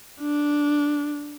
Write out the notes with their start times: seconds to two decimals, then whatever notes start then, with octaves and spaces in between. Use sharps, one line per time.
0.21 D4